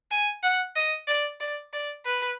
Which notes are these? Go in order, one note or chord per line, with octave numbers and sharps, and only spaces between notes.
G#5
F#5
D#5
D5
D5
D5
B4